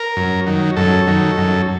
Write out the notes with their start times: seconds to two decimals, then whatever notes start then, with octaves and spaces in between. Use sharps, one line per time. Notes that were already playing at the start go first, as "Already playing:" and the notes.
Already playing: A#4
0.17 F#2
0.46 D#3 F#3
0.76 F#2 A4
1.07 D#3 F#3
1.38 F#2